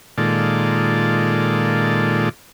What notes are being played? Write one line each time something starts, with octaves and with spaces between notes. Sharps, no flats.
A#2 D#3 G#3 F4 A4 D5